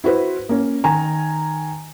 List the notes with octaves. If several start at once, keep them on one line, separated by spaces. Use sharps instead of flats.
E4 F#4 B4 C5
A#3 C#4
D#3 G#5 A#5